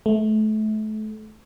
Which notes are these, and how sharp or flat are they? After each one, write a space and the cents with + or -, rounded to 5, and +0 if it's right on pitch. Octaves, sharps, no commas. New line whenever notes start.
A3 -30